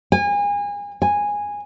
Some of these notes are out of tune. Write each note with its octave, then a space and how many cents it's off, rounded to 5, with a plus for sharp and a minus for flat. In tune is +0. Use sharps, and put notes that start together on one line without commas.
G#5 -30
G#5 -10